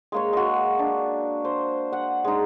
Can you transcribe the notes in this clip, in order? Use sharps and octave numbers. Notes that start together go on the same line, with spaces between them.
G#3 A#3 C#5
G#3 F#4
D4
C5
F#5
G#3 D#4